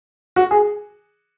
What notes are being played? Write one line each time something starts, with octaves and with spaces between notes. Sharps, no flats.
F#4
G#4